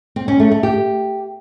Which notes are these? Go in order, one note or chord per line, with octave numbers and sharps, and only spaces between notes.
C4
C#4
A3
A3
G4